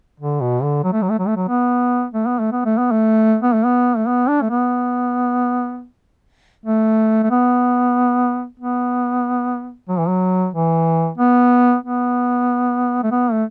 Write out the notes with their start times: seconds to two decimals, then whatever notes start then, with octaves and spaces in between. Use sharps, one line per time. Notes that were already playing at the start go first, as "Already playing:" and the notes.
0.20 D3
0.41 B2
0.63 D3
0.84 F#3
0.93 A3
1.02 F#3
1.10 A3
1.19 F#3
1.27 A3
1.36 F#3
1.48 B3
2.13 A3
2.26 B3
2.39 A3
2.52 B3
2.65 A3
2.78 B3
2.91 A3
3.42 B3
3.54 A3
3.65 B3
3.97 A3
4.07 B3
4.29 D4
4.42 A3
4.50 B3
6.66 A3
7.23 A3
7.31 B3
8.59 B3
9.89 F#3
9.99 E3
10.08 F#3
10.53 E3
11.18 B3
11.83 B3
13.03 A3
13.11 B3
13.32 A3